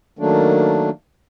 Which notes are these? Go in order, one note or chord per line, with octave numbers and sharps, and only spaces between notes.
D#3 F#3 A3 A#3 D4